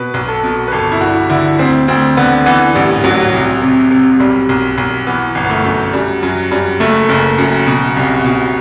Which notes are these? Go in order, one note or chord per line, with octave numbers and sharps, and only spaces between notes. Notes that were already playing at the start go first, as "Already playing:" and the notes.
Already playing: B2 B4
B1
A4
B2
B4
G1 A4
E4
G2 F#4
D3 E4
D2 C4
D2 C4
D3 B3
E3 B3
A1 G3
A1 F#3
C2
C3
C3
B1 G3
B1
B1
E3 B3
G1
B3
A3
F#2
F#2 G3
F#2 F#3
F#2 G3
F#1 A3
F#1
F#2
B2
C2
B2